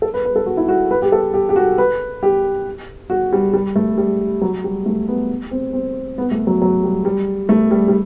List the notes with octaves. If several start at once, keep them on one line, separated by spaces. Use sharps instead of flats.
A4
B4
B4
A4
F#4
E4
F#4
B4
G4
A4
G4
G4
F#4
B4
G4
F#4
G3
G3
A3
G3
F#3
G3
A3
B3
C4
C4
B3
A3
F#3
F#3
G3
G3
A3
G3
G3